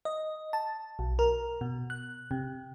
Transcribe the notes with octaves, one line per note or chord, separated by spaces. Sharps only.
D#5
A5
B1
A#4
B2
F#6
C3